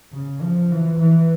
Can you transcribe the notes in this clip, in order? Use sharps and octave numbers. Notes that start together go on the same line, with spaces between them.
C#3
F3
E3
E3